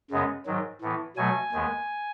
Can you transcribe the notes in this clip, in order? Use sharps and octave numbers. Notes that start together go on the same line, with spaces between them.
F#2 C#3 G#3 B3
G#2 D#3 F#3
A2 E3 B3
B2 F#3 A3 G#5
D#2 D#3 G#3 B3